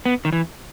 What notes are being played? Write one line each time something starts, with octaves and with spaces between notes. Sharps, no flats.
B3
D#3
E3